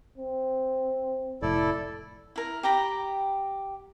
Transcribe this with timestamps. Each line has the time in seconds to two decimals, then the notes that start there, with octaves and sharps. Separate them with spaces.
0.18 C4
1.42 F1 A2 E4 A4 D5
2.36 E4 A#4
2.63 G4 G5 A#5 B5